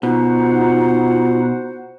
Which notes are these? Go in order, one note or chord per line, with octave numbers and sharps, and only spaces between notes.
B2 D#4 F4 F#4 C5 F#5